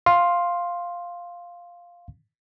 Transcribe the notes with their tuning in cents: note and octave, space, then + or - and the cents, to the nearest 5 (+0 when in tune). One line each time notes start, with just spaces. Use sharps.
F5 +0 C6 +10